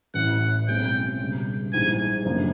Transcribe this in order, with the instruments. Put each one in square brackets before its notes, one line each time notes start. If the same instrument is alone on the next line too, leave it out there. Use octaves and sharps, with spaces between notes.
[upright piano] A1 A2 E3 [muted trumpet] F#5
[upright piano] B1 B2 G#3 C4 [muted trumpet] G5
[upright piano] C#2 B2 G3
[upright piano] A#1 G#2 E3 G3 [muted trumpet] G#5
[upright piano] F#1 F#2 D3 F3 A#3